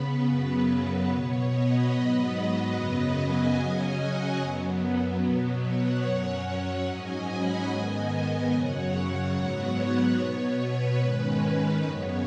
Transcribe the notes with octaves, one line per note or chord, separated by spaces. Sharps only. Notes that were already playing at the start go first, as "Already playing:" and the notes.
Already playing: C#3 B3 B4
F#2 C#3 F#3 B3
B2 B3 C#5
B4 D#5
G#2 F#3 B3
F#2 C#3 F#3 B3
D#5 G#5
C#3 F#3 C#4
C#5 F#5
F#2 F#3 B3
B2 F#3 B3
C#5 F#5
F#2 F#3 C#4
C#5 F#5
G#2 F#3 C#4 D#5 G#5
F#5 B5
G#2 D#3 B3 D#5 G#5
F#2 C#3 F#3 C#5 F#5
G#2 F#3 B3
C#5
B2 B3
B4
G#2 D#3 G#3 C#4
F#2 C#3 B3 C#5